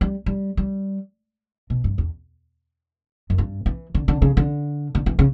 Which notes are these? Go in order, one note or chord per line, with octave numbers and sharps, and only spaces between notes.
G3
G3
G3
B2
G2
E2
F#2
G2
E3
D3
D3
C#3
D3
D3
E3
C#3